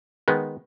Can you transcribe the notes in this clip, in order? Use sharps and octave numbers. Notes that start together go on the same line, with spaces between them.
D#3 G#3 B3